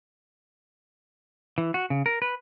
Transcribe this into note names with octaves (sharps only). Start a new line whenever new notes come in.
E3
F#4
C#3
A#4
B4